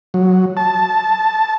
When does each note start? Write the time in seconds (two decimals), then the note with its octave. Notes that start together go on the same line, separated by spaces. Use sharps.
0.14 F#3
0.57 A5